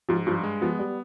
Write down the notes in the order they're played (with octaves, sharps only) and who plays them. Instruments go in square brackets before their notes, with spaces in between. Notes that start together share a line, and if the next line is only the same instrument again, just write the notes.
[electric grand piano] G#2 [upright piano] F3
[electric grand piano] G2 [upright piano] F3
[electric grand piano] G#3
[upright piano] F3 [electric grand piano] B3
[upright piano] G3